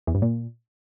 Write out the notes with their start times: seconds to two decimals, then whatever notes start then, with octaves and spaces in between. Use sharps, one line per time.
0.07 E2
0.15 G2
0.22 A#2